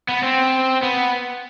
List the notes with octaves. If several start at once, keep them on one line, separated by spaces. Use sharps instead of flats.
B3
C4
B3